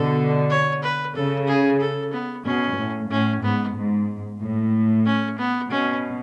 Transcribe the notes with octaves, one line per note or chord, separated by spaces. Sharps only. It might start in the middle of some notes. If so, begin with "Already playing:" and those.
Already playing: B2 D3 A4
C#5
B4
C#3 A4
G#4
A4
B3
B2 C#4
A2
A2 C#4
G#2 B3
G#2
A2
C#4
B3
B2 C#4